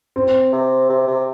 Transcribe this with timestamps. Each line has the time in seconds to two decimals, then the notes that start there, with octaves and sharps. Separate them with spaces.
0.16 C4
0.52 C3
0.89 C3
1.07 C3